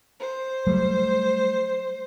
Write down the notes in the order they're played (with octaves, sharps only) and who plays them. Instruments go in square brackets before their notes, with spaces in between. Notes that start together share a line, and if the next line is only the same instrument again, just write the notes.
[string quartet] C5
[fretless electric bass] F#3 G3 A3